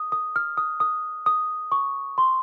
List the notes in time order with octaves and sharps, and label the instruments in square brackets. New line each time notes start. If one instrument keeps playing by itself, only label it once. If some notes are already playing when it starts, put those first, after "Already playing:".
Already playing: [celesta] D#6
D#6
F6
D#6
D#6
D#6
C#6
C6